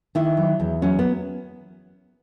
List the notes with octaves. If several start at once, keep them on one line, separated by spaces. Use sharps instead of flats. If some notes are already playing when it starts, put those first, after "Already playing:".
D#3 E4
F#3
E2
F#3 C#4
B3